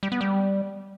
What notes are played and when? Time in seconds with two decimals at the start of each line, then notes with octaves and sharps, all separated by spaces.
0.03 G3
0.12 B3
0.21 G3